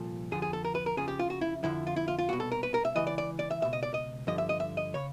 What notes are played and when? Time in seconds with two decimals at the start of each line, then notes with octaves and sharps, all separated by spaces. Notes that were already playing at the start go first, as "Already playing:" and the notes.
Already playing: C2 A#2 F3 A4
0.31 F2 D3 F3 G#4
0.42 G#4
0.53 A4
0.65 A#4
0.75 B4
0.86 A#4
0.97 F2 C#3 F3 G#4
1.08 G4
1.19 F4
1.30 F#4
1.41 E4
1.64 F2 D3 F3 E4
1.87 F4
1.96 E4
2.08 F4
2.19 F4
2.29 C2 B2 F#4
2.40 A4
2.52 A#4
2.63 B4
2.74 A#4
2.85 E5
2.96 C#2 C#3 E3 D#5
3.07 D5
3.18 D5
3.39 D5
3.51 E5
3.62 C#2 B2 E5
3.73 D#5
3.83 D5
3.94 D#5
4.27 G2 D3 F3 D#5
4.38 E5
4.49 D#5
4.60 E5
4.77 D#5
4.94 C#3 C#5